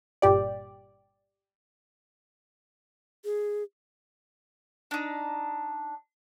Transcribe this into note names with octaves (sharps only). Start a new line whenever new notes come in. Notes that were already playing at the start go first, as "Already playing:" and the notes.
G1 G2 A#2 G4 D5
G#4
D4 D#4